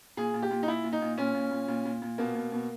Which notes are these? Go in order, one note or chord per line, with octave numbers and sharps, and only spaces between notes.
A#2 G#4
A#2
G4
A#2
D#4
A#2 E4
A#2
D#4
A#2
A#2 C#4
A#2
A#2
A#2
A#2
A#2
B2 A#3
B2
B2